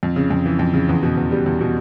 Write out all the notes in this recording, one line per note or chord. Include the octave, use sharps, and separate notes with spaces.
F2
C#3
F2
E3
F2
C#3
E2
B2
E2
G3
E2
B2